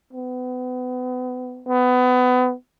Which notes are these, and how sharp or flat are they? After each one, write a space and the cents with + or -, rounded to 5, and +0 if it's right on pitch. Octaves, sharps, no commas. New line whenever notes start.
B3 +35
B3 +25